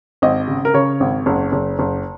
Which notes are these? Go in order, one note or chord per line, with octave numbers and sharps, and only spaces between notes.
G#1 D#5
C#3
A#4
C#3 C#5
G#1
F#1
F#1
F#1